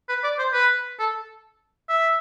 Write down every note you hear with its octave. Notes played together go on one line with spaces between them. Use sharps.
B4
D5
C5
B4
A4
E5